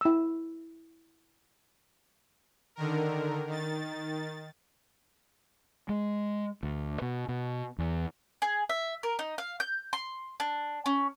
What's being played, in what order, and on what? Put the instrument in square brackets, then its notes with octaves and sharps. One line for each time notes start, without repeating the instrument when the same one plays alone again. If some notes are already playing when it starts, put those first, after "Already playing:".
[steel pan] E4 E6
[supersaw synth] D3 D#3 A#4
D#3 A6
[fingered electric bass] G#3
D2
B2
B2
E2
[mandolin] G#4
E5
A#4
D#4
F5
G6
C6
D4
C#4